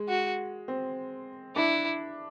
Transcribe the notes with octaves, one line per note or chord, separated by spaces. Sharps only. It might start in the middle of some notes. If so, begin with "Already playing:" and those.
Already playing: G#3
F#4
C4
D4 E4